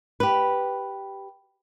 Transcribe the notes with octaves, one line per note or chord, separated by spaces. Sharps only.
G4 B4